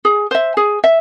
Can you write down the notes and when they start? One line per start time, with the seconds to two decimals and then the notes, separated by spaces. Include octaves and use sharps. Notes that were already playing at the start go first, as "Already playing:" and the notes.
0.05 G#4
0.31 C5 E5
0.57 G#4
0.84 E5